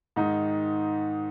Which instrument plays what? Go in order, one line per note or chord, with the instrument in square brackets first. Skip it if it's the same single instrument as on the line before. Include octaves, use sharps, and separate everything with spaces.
[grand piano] G#2 D#3 D#4